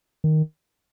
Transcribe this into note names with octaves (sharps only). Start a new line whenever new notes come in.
D#3